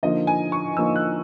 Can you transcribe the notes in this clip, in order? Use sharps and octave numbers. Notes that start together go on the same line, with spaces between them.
D3 F3 A#3 D#4 D#5
G#5
C#6
D3 F3 A#3 D#4 E6
F#6